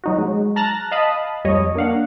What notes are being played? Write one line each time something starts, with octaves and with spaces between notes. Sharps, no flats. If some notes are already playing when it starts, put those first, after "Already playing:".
F#3 D#4 F#4
F#3 G#3
A5 A#5 F6 F#6 A6 A#6
D#5 F5 A5 B5 D#6
F2 G3 C#5 D#5
A#3 D4 F5 F#5